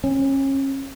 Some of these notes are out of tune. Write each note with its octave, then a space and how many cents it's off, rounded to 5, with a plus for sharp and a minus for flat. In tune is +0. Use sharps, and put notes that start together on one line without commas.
C#4 -30